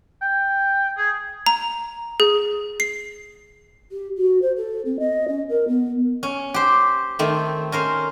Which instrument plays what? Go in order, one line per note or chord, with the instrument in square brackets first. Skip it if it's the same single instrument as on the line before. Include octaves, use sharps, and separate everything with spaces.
[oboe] G5
G#4
[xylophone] A#5
G#4
C7
[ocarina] G4
F#4
C5
A4
C4
D#5
C#4
A#4
B3
[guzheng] C#4
G4 C5
D#3 A3 C4
C#4 A#4 C5